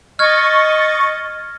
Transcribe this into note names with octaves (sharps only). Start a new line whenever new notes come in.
D#5 C#6 F6 G#6 A6